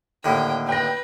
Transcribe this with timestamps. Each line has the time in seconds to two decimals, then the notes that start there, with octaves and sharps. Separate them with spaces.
0.24 D#2 A2 D3 G5
0.69 B4 G5 A#6